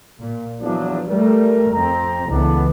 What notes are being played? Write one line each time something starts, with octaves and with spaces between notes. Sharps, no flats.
A#2
E2 F3 F#3 D4
G3 A3 A#4
F2 C4 A#5
C#2 A2 E3 B3 D4